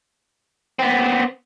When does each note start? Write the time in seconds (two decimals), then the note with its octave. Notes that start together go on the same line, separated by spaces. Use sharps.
0.79 B3 C4